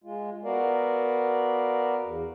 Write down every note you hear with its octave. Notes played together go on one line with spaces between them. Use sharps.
G#3 F4
B3 F#4 A#4 D5 F5
E2